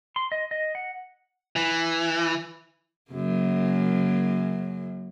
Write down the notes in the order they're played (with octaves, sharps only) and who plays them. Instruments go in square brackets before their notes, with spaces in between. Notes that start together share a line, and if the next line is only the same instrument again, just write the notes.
[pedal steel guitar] C6
D#5
D#5
F#5
[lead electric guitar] E3
[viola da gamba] F#2 C#3 A#3